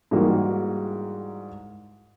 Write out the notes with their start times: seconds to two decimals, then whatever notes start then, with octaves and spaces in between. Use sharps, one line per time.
0.11 G#2 E3 G3 G#3 A#3 F#4